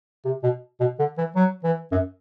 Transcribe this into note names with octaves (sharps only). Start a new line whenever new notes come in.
C3
B2
B2
D3
E3
F#3
E3
F#2